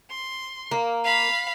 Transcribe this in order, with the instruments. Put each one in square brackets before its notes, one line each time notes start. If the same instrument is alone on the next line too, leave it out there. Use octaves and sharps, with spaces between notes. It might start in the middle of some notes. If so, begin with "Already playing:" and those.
[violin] C6
[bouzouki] A#3
[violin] F5 B5